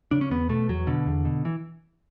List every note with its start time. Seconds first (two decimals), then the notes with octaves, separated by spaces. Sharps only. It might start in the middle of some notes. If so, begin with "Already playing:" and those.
0.11 C#3 D4
0.21 C#4
0.31 E2 B3
0.49 B2 A3
0.69 E2 F#3
0.87 B2 D3
1.07 E2
1.25 B2
1.45 E3